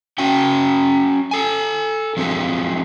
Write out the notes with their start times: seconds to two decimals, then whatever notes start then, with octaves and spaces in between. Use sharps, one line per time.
0.18 C#4 F#4 G5
1.31 A4 G#5
2.17 F3 F#3 G#3 C4